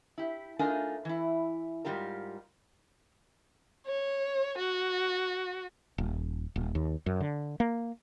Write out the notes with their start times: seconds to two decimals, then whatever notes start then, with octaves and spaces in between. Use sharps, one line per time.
0.18 E4 G4
0.59 A3 D4 D#4 F4 A#4 G#5
1.05 E3 E4
1.85 G#2 D#3 G3 F4 G4 A#4
3.87 C#5
4.58 F#4
5.98 D#1
6.56 D#1
6.75 D#2
7.06 F#2
7.21 D3
7.60 A#3